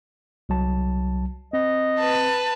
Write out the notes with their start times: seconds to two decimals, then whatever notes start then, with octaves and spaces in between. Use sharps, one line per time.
0.49 C2 F#3 A5
1.53 C4 D#5
1.99 B4 A5